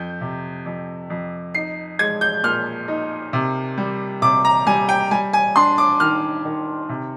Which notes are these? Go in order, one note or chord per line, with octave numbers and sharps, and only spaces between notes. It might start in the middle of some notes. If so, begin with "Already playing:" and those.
Already playing: F2 G6
C3
F2
F2
D#4 C7
G#3 G#6
G6
A#2 F6
D#4
C3
G3
C3 D6
A#5
G3 G#5
G5
G3 G#5
G#5
D4 C6
D6
D#3 F6
D#3
C3